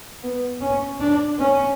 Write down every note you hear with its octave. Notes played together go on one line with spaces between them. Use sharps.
B3
C#4
D4
C#4